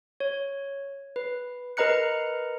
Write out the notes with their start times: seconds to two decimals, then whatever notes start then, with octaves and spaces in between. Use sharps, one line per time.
0.20 C#5
1.16 B4
1.77 A#4 B4 D#5 A#5 F#6 C#7